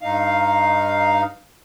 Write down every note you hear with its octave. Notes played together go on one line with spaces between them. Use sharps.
G2 D#4 F5